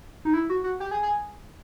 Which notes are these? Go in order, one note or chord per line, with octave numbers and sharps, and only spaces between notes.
D#4
E4
F#4
F#4
G4
G#4
G#4